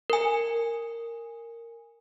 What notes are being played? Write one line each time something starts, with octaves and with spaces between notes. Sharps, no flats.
A#4 G#5